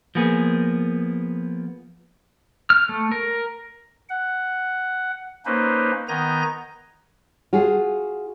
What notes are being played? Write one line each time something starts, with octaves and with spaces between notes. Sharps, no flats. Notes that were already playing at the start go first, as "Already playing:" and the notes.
F3 A#3 B3 G#4
F6
A3
A#4
F#5
A#3 C#4 D#4 B4 C5
D#3 B3 G#5 A#5 G6 A#6
F4 F#4 G#4